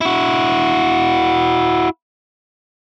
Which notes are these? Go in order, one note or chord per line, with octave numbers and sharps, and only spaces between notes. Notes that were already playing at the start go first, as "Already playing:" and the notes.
E4 F#4